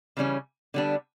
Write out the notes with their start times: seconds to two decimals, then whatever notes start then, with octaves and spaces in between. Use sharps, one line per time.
0.17 C#3 E3 G3 C#4
0.74 D3 G3 B3 D4